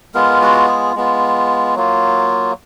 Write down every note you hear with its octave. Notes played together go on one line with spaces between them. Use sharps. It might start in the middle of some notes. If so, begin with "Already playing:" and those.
G#3 B3 F4 A#4
F#4
G#4
G#3 B3 F4
F#3 A#3 F4